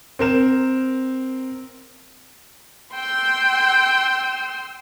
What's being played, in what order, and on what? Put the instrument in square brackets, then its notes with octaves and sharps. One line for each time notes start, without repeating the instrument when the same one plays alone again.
[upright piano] C4 A#4 E7
[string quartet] G5 C6 E6